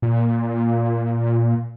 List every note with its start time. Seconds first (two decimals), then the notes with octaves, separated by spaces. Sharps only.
0.02 A#2